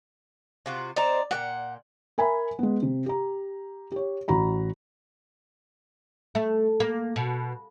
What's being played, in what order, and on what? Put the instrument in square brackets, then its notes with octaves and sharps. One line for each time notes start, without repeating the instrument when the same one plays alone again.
[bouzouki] C3 F4 F#4
[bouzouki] C4 D#4 C5 [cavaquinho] D5 A#5
[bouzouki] A#2 A#3 G5 [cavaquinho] F#5
[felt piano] A#4 E5 G#5 A#5 B5
G#3 B3
C3
G4 A#5
G4 C#5
A1 F#4 A#5 B5
[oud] A3
A#3
B2